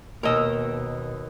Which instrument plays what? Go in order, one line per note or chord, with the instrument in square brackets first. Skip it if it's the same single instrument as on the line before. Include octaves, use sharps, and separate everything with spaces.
[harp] D#2 E6 [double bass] B2 [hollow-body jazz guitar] A#4 D#5